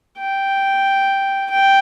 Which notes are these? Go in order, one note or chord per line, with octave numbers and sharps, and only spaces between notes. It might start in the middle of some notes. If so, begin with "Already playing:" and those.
G5
G5